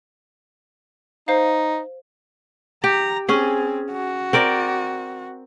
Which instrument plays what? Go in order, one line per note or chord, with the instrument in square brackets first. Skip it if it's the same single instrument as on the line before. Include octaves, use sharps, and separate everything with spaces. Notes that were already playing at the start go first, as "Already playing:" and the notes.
[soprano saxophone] D#4 [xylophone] C5 F5
[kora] G4 [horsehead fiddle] A#5
[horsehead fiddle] C4 [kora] C#4 G#4
[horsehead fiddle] F#4
[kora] C4 A#4 D5